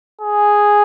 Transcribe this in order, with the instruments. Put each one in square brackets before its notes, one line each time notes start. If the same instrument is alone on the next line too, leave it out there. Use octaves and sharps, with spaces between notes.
[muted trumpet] G#4